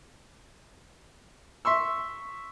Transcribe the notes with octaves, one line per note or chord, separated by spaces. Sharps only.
E5 C6 C#6 E6